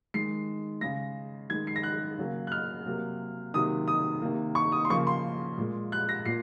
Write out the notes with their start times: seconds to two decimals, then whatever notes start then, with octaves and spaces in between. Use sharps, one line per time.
0.14 D#3 G#3 C7
0.81 C#3 G#3 A#6
1.50 D#3 G#3 G#6
1.67 C7
1.76 A#6
1.83 F#6
2.18 C#3 F#3 A#3
2.47 F#6
2.52 F6
2.86 C3 F#3 A#3
3.54 C3 D#3 F#3 A#3 D#6
3.88 D#6
4.22 C3 D#3 A#3
4.55 C#6
4.72 D#6
4.85 C6
4.90 C#3 F3 A#3 C#6
5.07 C6
5.58 A#2 G#3
5.92 F#6
6.09 A#6
6.25 A#2 C7